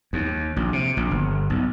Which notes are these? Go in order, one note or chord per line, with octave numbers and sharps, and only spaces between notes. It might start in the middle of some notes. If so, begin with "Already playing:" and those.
D#2
A#1
C3
A#1
G1
B1